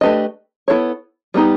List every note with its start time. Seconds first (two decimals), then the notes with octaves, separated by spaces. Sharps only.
0.01 A3 D4 G4 B4 D#5
0.68 B3 E4 A4 C#5
1.34 G3 B3 D#4 G4